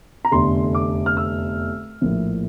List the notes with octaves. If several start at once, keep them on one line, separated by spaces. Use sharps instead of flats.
A#5
F1 E2 D3 C6
D6
F6
E6
A#1 A2 F3 A#3 E4